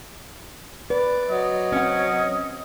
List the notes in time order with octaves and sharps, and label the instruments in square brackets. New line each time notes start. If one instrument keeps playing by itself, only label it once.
[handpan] B4 [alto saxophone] D5
[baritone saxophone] F#3 [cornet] D#5
[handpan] C4 F#5 [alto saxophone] C#4